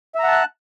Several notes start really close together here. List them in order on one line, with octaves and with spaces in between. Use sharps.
E5 A#5 F#5 A5 F#6